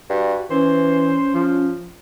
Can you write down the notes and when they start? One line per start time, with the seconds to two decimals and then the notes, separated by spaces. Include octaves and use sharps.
0.10 G2 F#4
0.51 E3 C#4 C5
1.34 F3